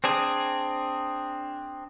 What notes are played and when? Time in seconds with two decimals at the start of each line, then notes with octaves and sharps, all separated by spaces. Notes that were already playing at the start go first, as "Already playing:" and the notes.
0.04 C4 D4 G#4